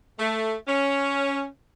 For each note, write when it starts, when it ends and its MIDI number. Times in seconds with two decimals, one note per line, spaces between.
0.19 0.56 57
0.68 1.45 61